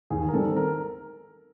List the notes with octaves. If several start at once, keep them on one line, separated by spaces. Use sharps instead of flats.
D#2 G#4
A#4
D#3 G3 C4 A4
A#4